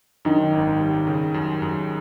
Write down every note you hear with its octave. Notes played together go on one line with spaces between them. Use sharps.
F#2 D#3 D#4
G#1
G3
C#3
F#2
F#2